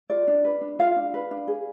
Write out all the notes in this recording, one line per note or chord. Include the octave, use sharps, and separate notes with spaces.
F4 D5
D4
B4
D4
F4 F5
D4
B4
D4
G#4